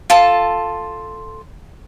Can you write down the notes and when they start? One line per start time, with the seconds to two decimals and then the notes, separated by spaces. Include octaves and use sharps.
0.10 F4 A4 A5